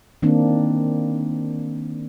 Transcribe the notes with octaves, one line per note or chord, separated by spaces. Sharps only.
D#3 A#3 C4 D4